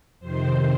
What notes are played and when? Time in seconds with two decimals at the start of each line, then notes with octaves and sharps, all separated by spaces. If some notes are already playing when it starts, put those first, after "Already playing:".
0.20 F2 C3 D#3 C5